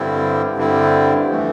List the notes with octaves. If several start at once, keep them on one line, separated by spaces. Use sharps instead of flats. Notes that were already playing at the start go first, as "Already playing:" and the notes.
Already playing: G2 D3 G3 C4 E4
G2 D3 G3 C4 E4
F2 E3 A3